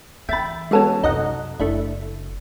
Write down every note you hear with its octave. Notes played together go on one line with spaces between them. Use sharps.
E3 E5 G5 B5 A6
G#3 B3 C#4 F#4 A4 A5
F#2 C3 D#4 D#5 F#5
F#1 A3 D4 E4